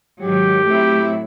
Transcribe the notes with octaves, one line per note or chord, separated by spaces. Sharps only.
G#2 D#3 F#3 G4
A2 F#3 A3 C4 E4